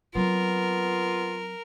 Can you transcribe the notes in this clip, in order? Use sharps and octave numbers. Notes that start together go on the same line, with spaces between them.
F#3 B3 C4 F4 A#4